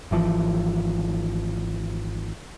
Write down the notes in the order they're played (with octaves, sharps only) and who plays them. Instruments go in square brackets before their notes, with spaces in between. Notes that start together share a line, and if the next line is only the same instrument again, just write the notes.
[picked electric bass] G#1 E3 F3